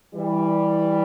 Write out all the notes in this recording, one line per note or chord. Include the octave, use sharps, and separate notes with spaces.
E3 G3